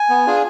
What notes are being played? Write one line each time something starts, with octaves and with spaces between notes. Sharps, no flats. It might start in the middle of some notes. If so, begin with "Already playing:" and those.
Already playing: G#5
B3
D4 F4 G#4